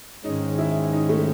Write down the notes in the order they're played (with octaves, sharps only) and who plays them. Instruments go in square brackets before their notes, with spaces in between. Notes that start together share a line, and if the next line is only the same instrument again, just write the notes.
[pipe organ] G#2 D#3 G#3 C#4 [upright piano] D#4
[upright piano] E4
D#4
A3